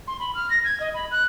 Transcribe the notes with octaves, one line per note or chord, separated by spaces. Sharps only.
C6
B5
F6
A#6
G#6
D#5
B5
F#6